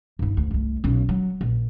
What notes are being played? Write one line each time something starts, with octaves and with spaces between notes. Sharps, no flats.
G2 D#4
D2
C2 A3
B1 C#4
F#3
A#1